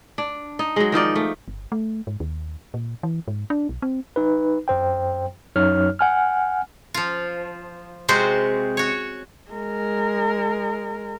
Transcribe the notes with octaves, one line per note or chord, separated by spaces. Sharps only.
D4
D#4
F#3 G#3
D#3 F3 D#4 D5
A3
G1
A3
G#2
D#2
A#2
E3
G#2
D4
B1
C4
D#4 B4
F#2 C5 G5
F#2 F#3 D#4 C#5 F6
F#5 G#5 F6
F3 F4
C3 G#3 C4 F#4 C5 C6
F#4 C#5
G#3 A#4